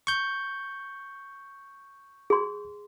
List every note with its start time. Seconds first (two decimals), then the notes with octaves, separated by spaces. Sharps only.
0.07 C#6 G6
2.30 G#4 C6